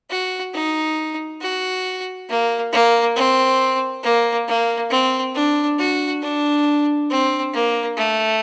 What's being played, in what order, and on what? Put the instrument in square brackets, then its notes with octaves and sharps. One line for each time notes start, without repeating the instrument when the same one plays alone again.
[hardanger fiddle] F#4
D#4
F#4
A#3
A#3
C4
A#3
A#3
C4
D4
F#4
D4
C4
A#3
A3